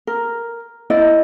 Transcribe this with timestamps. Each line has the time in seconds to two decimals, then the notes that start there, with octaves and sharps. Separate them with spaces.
0.07 A#4
0.90 E4 D5 D#5